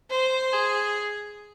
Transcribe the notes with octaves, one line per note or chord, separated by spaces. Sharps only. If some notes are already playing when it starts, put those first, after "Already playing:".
C5
G#4